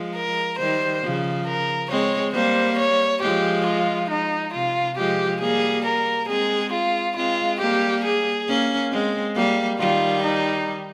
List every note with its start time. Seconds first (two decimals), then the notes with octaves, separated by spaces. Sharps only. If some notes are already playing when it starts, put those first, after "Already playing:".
Already playing: F3 G#3
0.15 A#4
0.59 D#3 G3 C5
1.03 C#3 F3
1.46 A#4
1.90 G#3 C4 C#5
2.34 G3 A#3 C5
2.78 C#5
3.22 F3 G#3 G4
3.66 F4
4.10 D#4
4.53 C3 F4
4.97 F3 G#3 G4
5.40 G3 A#3 G#4
5.85 A#4
6.29 G#3 C4 G#4
6.72 F4
7.16 G#3 C4 F4
7.60 G3 A#3 G4
8.04 G#4
8.48 A#3 C#4
8.92 G#3 C4
9.35 G3 A#3
9.79 D#3 G3 F4
10.23 D#4